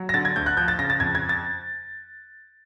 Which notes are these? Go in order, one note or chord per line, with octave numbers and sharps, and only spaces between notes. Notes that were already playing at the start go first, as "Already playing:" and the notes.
Already playing: F#3
A#6
D3 A6
G#6
D2 G6
F#6
F3 G6
A6
C#3 A#6
A6
F2 G#6
G#6
A6